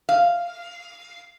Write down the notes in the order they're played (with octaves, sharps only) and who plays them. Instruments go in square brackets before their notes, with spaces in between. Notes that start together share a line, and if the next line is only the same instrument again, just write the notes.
[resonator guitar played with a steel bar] F5